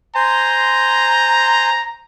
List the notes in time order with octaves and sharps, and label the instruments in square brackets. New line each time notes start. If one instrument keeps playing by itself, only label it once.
[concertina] C5 G#5 C6 [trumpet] A#5